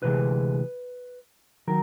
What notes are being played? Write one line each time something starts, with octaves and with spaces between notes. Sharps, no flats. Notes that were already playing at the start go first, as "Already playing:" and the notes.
D2 C3 E3 G#3 B4
D#3 F#3 A#4